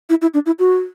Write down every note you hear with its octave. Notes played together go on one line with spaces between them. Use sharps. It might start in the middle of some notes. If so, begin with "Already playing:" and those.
E4
E4
D4
E4
F#4